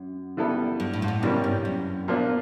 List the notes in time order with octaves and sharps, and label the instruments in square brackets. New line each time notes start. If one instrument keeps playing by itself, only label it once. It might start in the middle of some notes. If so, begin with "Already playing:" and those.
Already playing: [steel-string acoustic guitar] F#2
[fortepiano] E3 G3 B3 E4 A4
[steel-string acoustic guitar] G2
A2
G#2
A2
[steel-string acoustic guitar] G2 [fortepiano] C3 E3 G3 A#3 C#4
[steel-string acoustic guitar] G2
F#2
[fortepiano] A#2 F3 A#3 D4